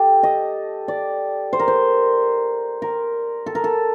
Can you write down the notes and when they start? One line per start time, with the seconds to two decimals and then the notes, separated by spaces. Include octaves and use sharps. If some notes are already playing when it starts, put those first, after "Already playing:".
Already playing: G4 A4
0.23 D#5
0.88 D5
1.53 C5
1.60 A#4
1.68 C5
2.82 A#4
3.46 A4
3.55 A#4
3.64 A4